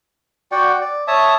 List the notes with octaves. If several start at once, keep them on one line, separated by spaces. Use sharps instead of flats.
F#4 D5 F#5 G5
D5
C#5 E5 A5 D#6